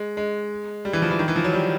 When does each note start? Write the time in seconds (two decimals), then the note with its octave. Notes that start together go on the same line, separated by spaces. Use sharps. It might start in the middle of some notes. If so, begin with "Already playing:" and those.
Already playing: G#3
0.17 G#3
0.85 G3
0.93 E3
1.02 F3
1.11 E3
1.19 D#3
1.28 E3
1.36 F3
1.44 F#3
1.53 G3